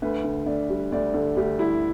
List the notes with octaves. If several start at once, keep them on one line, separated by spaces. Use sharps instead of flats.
D2 B4
D3
D2 D5
G3
D2 D5
D3 A4
D2 G4
G3 E4